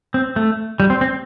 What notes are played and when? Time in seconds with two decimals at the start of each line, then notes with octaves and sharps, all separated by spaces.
0.14 C4
0.36 A3
0.80 G3
0.90 C4
1.01 C4